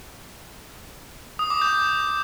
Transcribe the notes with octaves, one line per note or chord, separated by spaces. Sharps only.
D#6
D6
G6